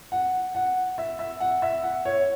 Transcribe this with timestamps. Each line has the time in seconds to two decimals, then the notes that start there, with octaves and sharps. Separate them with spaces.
0.12 F#5
0.55 F#5
0.98 E5
1.19 E5
1.40 F#5
1.62 E5
1.83 F#5
2.05 C#5